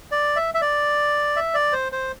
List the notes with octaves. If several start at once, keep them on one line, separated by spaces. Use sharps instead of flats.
D5
E5
E5
D5
E5
D5
C5
C5